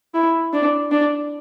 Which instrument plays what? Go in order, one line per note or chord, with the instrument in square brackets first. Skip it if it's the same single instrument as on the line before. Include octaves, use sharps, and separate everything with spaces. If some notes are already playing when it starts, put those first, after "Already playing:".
[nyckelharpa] E4
D4
D4